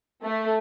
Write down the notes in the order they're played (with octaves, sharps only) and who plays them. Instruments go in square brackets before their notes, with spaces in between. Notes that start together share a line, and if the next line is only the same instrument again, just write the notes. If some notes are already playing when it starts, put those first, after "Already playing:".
[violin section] A3